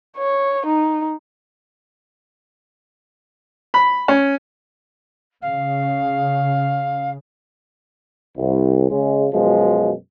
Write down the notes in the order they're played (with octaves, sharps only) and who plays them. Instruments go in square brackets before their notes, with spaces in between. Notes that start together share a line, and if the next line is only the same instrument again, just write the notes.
[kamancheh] C#5
D#4
[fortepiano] B5
C#4
[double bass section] C#3 [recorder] F5
[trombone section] C2
C#3 G#3
F#2 B2 F3 G#3